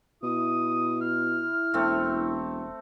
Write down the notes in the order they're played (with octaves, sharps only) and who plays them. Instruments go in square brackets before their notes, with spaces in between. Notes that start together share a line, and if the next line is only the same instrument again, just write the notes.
[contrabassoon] B2 [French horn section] E4 [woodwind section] D#6
[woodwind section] F6
[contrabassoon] E1 [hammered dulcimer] A3 C4